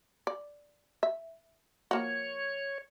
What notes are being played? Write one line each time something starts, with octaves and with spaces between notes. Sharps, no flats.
D5
E5
F3 A#3 F#4 C#5